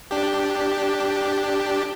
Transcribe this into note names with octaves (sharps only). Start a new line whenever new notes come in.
D4 G4